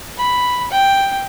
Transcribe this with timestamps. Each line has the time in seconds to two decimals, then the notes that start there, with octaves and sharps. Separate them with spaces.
0.18 B5
0.71 G5